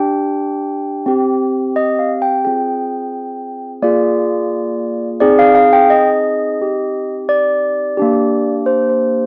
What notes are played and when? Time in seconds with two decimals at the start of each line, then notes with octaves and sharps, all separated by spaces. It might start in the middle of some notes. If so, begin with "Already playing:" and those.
Already playing: D4 G4 G5
1.06 C4 G4
1.76 D#5
1.99 F5
2.22 G5
2.45 C4 F4 G#4 G5
3.82 A#3 F4 G#4 D5
5.20 C4 D#4 G#4 D5
5.39 F5
5.55 F5
5.73 G5
5.90 D#5
6.59 C4 D#4 G4
7.29 D5
7.97 A#3 D4 G4
8.66 C5
8.89 C5